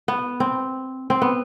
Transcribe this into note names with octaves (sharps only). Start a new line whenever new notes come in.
B3
C4
C4
B3